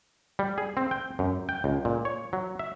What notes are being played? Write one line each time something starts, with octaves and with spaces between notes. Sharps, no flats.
G3
G#4
C4
G5
F#2
G5
C#2
A#2
C#5
F#3
E5